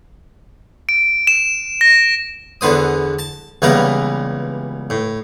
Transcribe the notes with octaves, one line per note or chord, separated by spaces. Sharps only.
D7
E7
A#6
E2 D3 B3 C5 D#6
A5
C#2 E3 G3 A#3 B3 A#4
A2